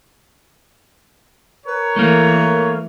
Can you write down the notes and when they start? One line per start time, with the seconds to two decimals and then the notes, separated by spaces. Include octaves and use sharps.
1.67 A#4 B4 C#5
1.96 E3 A3 A#3